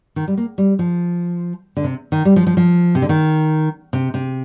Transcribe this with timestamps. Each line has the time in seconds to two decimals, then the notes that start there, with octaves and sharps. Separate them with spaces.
0.16 D#3
0.28 G3
0.37 A#3
0.58 G3
0.79 F3
1.77 D3
1.84 C3
2.12 D#3
2.25 G3
2.36 F3
2.47 F3
2.57 F3
2.95 C3
3.02 D3
3.09 D#3
3.93 C3
4.14 C3